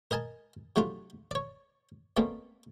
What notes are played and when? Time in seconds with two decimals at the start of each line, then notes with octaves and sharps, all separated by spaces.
0.11 A#4 D#5 G#5 A5
0.76 C3 F#3 A3 D4 F4
1.31 C#5 D5
2.17 B2 A3 A#3 C4 C#4